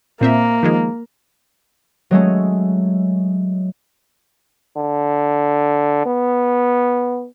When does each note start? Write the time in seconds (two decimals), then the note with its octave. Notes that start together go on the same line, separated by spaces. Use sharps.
0.21 A#2 A#3 C4 E5
0.63 D#3 F3 G#3
2.11 F#3 G#3 A3 C#4
4.77 D3
6.06 B3